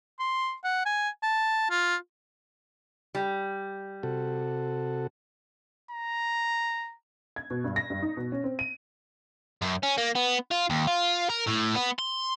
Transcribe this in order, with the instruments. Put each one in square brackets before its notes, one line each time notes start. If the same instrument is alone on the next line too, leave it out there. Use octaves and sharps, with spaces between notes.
[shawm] C6
F#5
G#5
A5
F4
[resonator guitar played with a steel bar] G3
[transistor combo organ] C3 F#4 A4
[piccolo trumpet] A#5
[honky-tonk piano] G#6
B2
G2
A#6
G2
D#4
B2
C#4
C4
D#7
[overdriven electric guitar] F#2
C#4
A#3
B3
F4
D#2
F4
A#4
A2
B3
C6